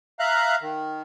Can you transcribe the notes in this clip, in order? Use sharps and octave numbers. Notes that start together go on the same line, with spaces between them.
E5 F5 A#5 F#6
D#3